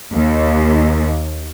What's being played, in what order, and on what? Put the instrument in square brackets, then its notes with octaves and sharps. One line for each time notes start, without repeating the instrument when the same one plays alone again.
[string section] D#2